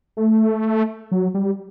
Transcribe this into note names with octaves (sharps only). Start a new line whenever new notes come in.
A3
F#3
G3